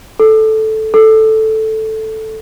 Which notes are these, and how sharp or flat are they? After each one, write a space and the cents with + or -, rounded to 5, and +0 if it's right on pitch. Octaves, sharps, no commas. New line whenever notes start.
A4 -5
A4 +0